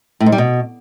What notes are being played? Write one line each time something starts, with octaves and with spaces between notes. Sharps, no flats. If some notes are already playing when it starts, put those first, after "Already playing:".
A2
G#2
G3
B2